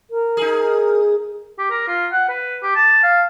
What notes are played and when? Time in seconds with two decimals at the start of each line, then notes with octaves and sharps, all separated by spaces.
0.11 A#4
0.37 D#4 G#4
1.58 G4
1.70 A#4
1.87 F4
2.12 F#5
2.29 B4
2.62 G4
2.75 A5
3.03 F5